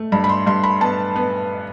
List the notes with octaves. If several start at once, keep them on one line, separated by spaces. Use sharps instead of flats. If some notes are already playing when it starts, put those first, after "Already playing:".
Already playing: A3
G2 B5
B5
C6
G2 C6
B5
B3 A5
B3